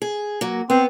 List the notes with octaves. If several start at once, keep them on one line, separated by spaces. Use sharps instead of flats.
G#4
F#3 A#3
B3 C4